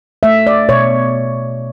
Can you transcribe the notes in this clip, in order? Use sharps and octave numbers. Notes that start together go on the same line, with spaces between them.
A3 E5
D5
B2 C#5